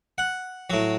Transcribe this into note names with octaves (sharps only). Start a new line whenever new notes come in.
F#5
A2 F#3